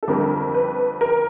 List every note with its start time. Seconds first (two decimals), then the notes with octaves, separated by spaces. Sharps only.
0.03 A4
0.08 F2 D3 G3 A#4
0.54 B4
1.01 A#4